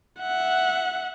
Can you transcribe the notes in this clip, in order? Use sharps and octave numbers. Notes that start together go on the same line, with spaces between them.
E5 F#5